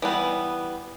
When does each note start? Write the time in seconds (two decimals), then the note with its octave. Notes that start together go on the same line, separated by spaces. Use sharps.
0.02 E3 G3 B3